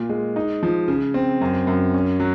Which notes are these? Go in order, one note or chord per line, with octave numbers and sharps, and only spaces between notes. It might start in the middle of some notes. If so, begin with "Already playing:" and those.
Already playing: A#2 F4
G#3
D#4
F3
C#3
C4
F#2
F#2
C#4
F#3